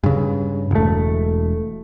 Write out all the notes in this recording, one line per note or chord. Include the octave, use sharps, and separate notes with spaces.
G2 C#3
E1 A3